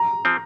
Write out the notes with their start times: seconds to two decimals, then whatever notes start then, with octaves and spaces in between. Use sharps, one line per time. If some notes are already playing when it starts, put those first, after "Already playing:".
Already playing: A#5
0.25 F3 C4